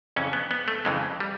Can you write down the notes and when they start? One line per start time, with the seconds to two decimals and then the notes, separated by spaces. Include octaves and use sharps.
0.16 F2 C#3 E3 C#4
0.33 B3
0.51 B3
0.68 A3
0.85 F2 C#3 E3 G#3
1.20 G3